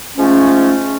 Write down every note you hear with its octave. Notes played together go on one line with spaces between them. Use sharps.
G#2 F3 A3 C#4